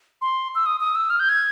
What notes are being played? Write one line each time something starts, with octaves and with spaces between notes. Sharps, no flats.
C6
E6
D#6
D#6
E6
F6
G6
G#6